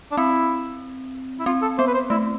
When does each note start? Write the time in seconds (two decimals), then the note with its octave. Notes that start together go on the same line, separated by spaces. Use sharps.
0.12 D4
0.17 C4 E4
1.39 E4
1.46 C4 F4
1.62 A4
1.78 B3 C5
1.87 B4
1.94 C5
2.10 A3 E4